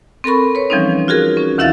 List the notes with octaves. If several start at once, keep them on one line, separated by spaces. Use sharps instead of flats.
C4 A4 A#4 B5 C#6
B4 C#5
E3 F3 G3 C4 C#4 D#4
F4 F#4 G#4 A#4
C#4
D2 D#3 E4 E5 F5 A6